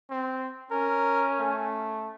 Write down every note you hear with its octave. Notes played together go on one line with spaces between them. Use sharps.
C4
C#4 A#4
A3